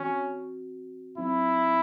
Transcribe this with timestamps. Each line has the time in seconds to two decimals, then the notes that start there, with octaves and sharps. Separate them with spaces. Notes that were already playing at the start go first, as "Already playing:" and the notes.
Already playing: E3 C4 C#4 F#4
1.18 F#3 C4 D#4 E4